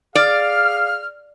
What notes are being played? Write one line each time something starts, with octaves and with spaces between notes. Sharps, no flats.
G#4 D5 F5 F6